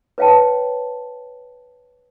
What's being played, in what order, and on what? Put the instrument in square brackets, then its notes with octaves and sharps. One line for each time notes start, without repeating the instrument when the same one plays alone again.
[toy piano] B4 C#5 F5 G5 A5